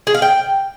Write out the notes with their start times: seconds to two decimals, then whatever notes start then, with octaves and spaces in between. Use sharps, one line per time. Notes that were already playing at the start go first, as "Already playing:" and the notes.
0.07 G#4
0.14 F5
0.22 G5